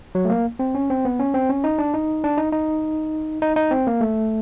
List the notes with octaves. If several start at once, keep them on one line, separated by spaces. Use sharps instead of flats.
F#3
A3
A#3
C4
C#4
C4
B3
C#4
C4
C#4
D#4
D4
D#4
D4
D#4
D#4
D#4
D#4
C4
A#3
A3